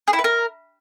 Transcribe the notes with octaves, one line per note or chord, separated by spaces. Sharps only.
G#4
E4
B4
A#4